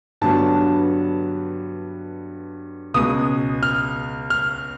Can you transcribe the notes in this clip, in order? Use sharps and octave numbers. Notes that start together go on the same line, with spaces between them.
G2 D3 F#3 B3 A5
C#2 B2 G#3 D#6
F6
F6